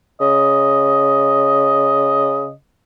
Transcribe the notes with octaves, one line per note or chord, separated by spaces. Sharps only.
C#3 D#5